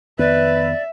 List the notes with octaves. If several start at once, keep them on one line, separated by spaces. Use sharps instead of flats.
F2 D#3 B3 B4 D5 E5